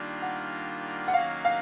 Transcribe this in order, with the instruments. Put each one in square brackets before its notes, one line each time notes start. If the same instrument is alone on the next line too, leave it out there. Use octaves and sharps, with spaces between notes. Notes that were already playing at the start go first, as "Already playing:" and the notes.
Already playing: [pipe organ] D#3 G3 A#3 D4 F4
[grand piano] F#5
F#5
[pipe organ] D#3 F#3 A#3 C#4 F#4 [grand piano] F5
[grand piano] F5